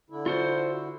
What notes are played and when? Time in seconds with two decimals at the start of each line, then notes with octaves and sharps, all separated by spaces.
0.10 D3 E4
0.26 F4 F#4 C5